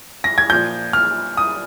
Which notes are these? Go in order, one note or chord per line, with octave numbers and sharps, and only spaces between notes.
A#6
G#6
A#2 F3 G6
F6
D#6